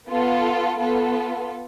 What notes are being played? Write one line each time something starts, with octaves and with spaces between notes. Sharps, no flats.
B3 F4 A4
B3 F4 A4